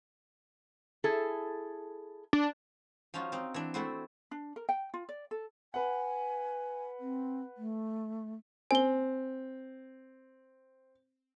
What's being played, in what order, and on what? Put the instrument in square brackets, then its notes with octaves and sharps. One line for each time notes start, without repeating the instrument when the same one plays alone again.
[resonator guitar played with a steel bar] E4 G#4 A4
[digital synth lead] D4
[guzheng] F3 C#4 D#4 F4 F#4
C4 D#4
E3 D4
A3 C4 E4 F#4 C5
[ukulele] D4
A#4
G5
F4
D5
A4
[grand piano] B4 F#5 [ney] G#5
[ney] C4
A3
[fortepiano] C4 [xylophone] G#5 G7